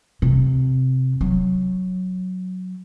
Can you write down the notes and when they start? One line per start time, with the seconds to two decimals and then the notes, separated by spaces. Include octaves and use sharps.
0.22 C3
1.21 F#3